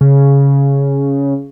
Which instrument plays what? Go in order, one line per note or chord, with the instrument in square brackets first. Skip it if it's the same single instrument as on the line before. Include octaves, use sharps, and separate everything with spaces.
[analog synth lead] C#3